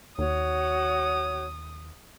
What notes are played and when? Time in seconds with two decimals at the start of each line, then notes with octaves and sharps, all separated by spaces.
0.18 D#2 F#4 C#5 D#6